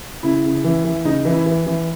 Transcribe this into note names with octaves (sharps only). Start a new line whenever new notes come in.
C#3 E4
C#3
E3
E3
C#3 D#4
E3
E4
E3
E3